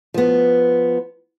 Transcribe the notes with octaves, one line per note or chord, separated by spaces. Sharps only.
F3 B3